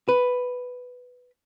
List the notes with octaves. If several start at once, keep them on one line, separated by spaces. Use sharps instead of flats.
B4